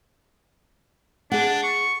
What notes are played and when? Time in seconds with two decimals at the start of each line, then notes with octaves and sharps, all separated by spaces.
1.32 D4 G#4 F#5
1.63 C#6